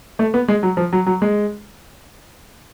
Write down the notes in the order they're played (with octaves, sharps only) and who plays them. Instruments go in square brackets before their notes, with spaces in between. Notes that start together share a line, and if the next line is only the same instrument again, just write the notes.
[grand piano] A3
B3
G#3
F#3
F3
F#3
F#3
G#3